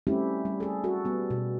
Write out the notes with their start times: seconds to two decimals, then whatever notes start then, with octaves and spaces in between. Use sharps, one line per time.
0.07 G3 A3 C4 C#4 E4 G4
0.45 G3
0.60 G#4 A4
0.84 F#4 A4
1.05 G3 B3
1.30 B2